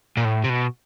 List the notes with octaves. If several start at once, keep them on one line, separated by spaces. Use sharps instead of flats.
A#2
A2
C3
B2